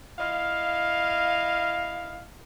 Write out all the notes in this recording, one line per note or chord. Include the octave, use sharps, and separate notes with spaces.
E4 D#5 F5